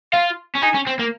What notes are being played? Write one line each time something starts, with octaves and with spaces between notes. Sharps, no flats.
F4 F5
C#4
D#4 G#5
C#4
C4
A#3